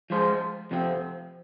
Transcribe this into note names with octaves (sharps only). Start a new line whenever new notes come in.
F3 G#3 F4 C5
F2 C3 F3 C4